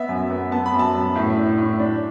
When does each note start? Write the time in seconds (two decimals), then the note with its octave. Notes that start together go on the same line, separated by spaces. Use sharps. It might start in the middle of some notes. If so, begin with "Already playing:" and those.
Already playing: B3 E5
0.09 F#2
0.30 B3
0.52 B3 A5
0.66 B5
0.73 F#2
0.79 A5
0.95 F#2
1.15 A2 E5
1.37 D4
1.58 A2
1.79 D4